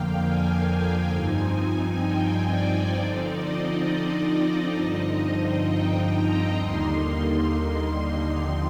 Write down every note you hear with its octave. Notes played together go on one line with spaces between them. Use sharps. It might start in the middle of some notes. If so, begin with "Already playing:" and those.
Already playing: F2 D3 F3 A#3 F5 G5
G#5
G2 F3 C4 D#4
G5
D5
D3 F3 C4 D#4 D5
D#5
G2 D3 F3 C4 D#4
G5
A#5
D#2 D3 G3 A#3 D#4 C6
D#2 D3 F3 C4 D#4 C6